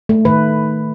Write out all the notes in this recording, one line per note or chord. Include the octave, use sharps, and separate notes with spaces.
A3
D#3 B4